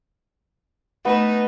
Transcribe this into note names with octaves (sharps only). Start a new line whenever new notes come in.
A3 B3 D#4 B4